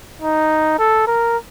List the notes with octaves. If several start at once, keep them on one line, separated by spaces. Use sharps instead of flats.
D#4
A4
A#4